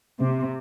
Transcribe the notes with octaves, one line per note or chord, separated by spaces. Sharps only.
C3